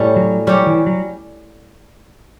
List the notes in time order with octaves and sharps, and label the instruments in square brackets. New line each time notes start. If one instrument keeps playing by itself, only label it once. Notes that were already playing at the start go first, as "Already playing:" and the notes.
Already playing: [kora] A2 G3 C#4
[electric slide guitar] F#3
[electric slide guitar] F#3 [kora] G3 C#4 G4 C#5
[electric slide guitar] E3
F#3